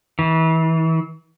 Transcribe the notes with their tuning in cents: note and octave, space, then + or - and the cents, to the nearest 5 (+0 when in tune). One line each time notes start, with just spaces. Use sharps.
E3 -35